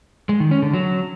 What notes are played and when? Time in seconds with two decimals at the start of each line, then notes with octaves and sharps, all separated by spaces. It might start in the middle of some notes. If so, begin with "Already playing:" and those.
0.29 G#3
0.40 D#3
0.51 C#4
0.62 D3
0.73 F#3